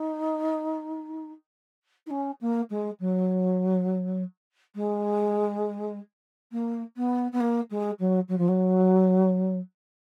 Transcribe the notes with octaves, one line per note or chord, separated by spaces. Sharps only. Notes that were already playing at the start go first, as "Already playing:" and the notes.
Already playing: D#4
D#4
C#4
A#3
G#3
F#3
G#3
A#3
B3
B3
A#3
G#3
F#3
F#3
F3
F#3